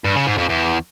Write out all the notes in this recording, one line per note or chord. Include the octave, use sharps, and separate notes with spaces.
G2
C#3
G#2
F2
E2